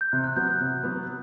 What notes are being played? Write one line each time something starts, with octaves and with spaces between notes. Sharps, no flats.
G6
C3 F#6
F#6
F#3 B3 G6
F#6
C3
F#3 B3